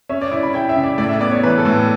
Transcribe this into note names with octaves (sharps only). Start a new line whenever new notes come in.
C#4 E5
D5
E4 D5
B5
E4 G5
E5
C#3
D5
A2 D5
E5
B3 D5
C#5
E3 B4
A4
A2